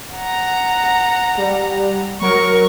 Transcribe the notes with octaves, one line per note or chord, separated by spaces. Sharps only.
F#5 A#5
G3
F#3 A#4 C#6